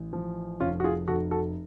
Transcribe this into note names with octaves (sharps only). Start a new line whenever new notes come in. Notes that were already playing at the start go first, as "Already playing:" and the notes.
Already playing: A1
F3
F1 C#4 F4
F#4
F4 G#4
F1 F#4 A4
F#4 A4